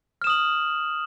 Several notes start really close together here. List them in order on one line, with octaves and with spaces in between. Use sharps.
F6 E7 D#6 F#7